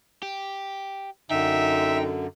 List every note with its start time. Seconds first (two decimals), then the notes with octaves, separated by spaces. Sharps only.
0.23 G4
1.31 F#2 D3 D#4 E5 G5